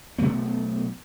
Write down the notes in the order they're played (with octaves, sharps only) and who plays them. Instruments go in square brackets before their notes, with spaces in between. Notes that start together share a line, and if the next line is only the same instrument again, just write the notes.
[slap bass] B2 F#3 A3 B3